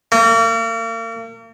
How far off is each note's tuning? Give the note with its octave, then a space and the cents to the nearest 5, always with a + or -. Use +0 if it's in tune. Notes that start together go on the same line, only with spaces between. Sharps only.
A#3 -40